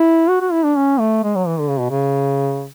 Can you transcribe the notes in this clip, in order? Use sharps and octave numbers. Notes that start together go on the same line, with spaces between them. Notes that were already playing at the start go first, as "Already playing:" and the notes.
Already playing: E4
F#4
F#4
E4
D4
C#4
A3
G#3
F#3
E3
D3
C#3
B2
C#3